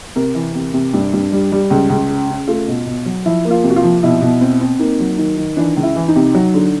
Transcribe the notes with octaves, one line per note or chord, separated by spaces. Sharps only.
C3 A#4
E3
C3
C3
G2
G2
G3
G3
C#2
C#2
C#3
C#3
A3 F4
B2
B2
F#3
F3 E4
A#3
F4
C3
F#4
F4
F3
B2 E4
B2
C4
C4
A#3 D#4
F#3
D#3
D#3
E3 D4
C#2
E4
E3
D#4
C3
F#3
D3